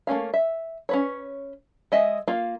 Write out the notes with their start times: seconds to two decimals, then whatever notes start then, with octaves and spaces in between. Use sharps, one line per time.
0.07 A3 A#3 C#4 F5
0.34 E5
0.89 C#4 B4 C#5
1.92 G#3 D#5 E5
2.28 A#3 F4 F5